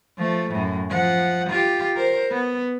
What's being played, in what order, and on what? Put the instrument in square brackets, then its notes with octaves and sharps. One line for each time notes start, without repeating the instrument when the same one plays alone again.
[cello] F3 A3
F#2 A2
F3 F#5
F4 G4
A#4 C5
B3